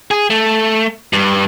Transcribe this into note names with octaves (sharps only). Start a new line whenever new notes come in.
G#4
A3
G2